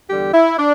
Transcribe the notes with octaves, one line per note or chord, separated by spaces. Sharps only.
E2 D3 G3 G4
E4
D4